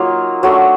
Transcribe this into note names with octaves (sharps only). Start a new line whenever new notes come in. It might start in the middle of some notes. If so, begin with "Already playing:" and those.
Already playing: F#3 A#3 D#4 F4
F#3 A3 D4 F#4